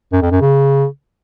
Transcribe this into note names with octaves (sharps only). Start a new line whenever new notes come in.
F#2
F2
F#2
C#3